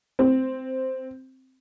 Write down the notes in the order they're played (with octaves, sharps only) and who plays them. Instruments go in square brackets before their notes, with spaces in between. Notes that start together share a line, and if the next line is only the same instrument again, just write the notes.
[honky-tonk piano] C4